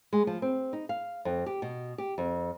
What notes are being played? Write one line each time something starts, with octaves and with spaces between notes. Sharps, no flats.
G#3
F3
C4
D#4
F5
F2
G4
B2
G4
F2